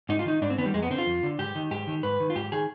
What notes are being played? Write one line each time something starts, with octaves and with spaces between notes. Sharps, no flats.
G#2 D#4
F4
D#3 D#4
G#2 D4
C4
D#3 B3
G3
F2 G#3
B3
D3 C4
F4
F2
D3
G#2 G4
D#3
G#2 G4
D#3
G#2 B4
D#3
F4
G#2 G4
D#3 G#4